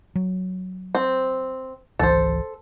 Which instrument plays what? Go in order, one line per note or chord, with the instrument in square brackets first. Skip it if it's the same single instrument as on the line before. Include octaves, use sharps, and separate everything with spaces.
[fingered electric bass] F#3
[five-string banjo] C4
[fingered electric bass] G#1 C#2 E3 [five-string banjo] A4 C5